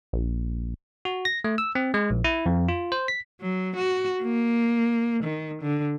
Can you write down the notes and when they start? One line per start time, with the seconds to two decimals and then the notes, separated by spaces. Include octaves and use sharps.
0.13 A#1
1.05 F#4
1.25 A#6
1.44 A3
1.58 E6
1.75 C4
1.94 G#3
2.10 A#1
2.24 E4
2.46 F2
2.68 F4
2.92 C5
3.08 B6
3.41 F#3
3.76 F#4
4.23 A#3
5.24 D#3
5.62 D3